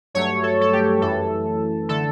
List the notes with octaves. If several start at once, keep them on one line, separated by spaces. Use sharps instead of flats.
G2 F#3 A3 C#5
A4
A4
G4
F#2 E3 A3 A4
D3 A3 A4